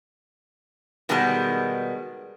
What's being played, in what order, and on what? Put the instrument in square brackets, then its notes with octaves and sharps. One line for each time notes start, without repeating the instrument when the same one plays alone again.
[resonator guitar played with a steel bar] B2 D#3 G3 G#3 B3 A5